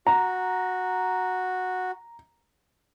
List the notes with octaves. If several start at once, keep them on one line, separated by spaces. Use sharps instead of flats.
F#4 A#5